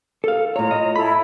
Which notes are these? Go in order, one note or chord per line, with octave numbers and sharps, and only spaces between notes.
A4 F5
A2 F4 C#5 A#5
D#5
E4 A4 B5